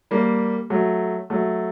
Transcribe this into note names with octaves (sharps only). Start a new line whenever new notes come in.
G3 A#3
F#3 A3
F#3 A3